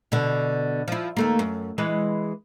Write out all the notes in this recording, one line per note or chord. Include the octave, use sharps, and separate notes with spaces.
B2 D3
F3 E4
D#2 A3 A#3
F#2
E3 G#3 B4